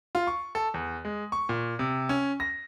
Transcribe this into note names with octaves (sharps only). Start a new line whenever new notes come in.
F4
C#6
A4
E2
G#3
C#6
A#2
C3
C#4
A#6